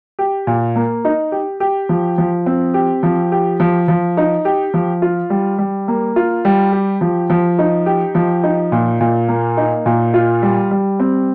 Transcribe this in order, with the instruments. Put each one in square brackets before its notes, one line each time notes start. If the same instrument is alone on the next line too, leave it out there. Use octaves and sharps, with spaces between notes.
[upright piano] G4
A#2
A#3
D#4
G4
G4
F3
F3
C4
G4
F3
G4
F3
F3
D#4
G4
F3
F4
G3
G3
A#3
F4
G3
G4
F3
F3
D#4
G4
F3
D#4
A#2
A#2
A#3
D#4
A#2
F4
G3
G3
C4